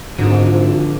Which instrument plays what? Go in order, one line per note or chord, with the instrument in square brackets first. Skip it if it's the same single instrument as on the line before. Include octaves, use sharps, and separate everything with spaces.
[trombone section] G#1 [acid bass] G#2 [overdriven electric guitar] D3 [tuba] F3